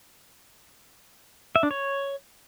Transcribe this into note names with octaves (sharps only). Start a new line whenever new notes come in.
E5
D4
C#5